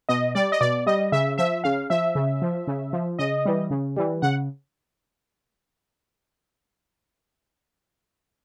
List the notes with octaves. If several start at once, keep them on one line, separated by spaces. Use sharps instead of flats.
B2 D#5
G3 D5
D#5
B2 D5
G3 D#5
C#3 E5
F3 E5
C#3 F5
F3 E5
C#3
F3
C#3
F3
C#3 D#5
E3 G3
C#3
E3 G3
C#3 F#5